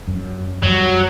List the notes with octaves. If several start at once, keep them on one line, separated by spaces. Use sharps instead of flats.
F#2
F#2 F#3 G3